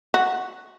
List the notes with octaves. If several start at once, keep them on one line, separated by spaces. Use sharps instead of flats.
F#4